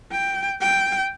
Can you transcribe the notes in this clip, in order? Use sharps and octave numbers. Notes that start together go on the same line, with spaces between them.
G5
G5